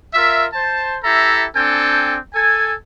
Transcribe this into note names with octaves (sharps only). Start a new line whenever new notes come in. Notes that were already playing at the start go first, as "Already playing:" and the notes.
F4 A#4 E5
C5 A5
E4 G4 A4 E5 A#5
C4 D4 A4 G5 G#5
A4 G#5